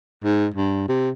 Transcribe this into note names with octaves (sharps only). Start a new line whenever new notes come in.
G#2
G2
C3